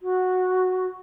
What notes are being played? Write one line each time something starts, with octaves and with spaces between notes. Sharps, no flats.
F#4